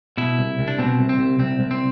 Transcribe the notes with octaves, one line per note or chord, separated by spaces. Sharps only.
B2 E4
C2
C2
D4
B2 C4
C2
C4
C2
C2 C4
C2
C4